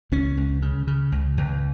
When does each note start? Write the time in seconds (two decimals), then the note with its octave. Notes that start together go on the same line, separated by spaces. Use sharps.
0.12 C#2 C#4
0.37 C#2
0.62 C#3
0.87 C#3
1.12 C#2
1.37 C#2